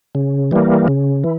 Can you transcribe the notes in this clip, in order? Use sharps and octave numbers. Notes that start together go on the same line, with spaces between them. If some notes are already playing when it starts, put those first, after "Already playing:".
C#3
E3 G3 A#3
C#3
E3